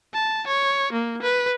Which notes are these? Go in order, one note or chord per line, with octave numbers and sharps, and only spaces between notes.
A5
C#5
A#3
B4